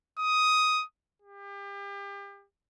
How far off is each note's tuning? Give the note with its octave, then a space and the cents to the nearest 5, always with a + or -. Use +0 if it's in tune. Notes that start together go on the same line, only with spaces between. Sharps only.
D#6 +10
G4 +35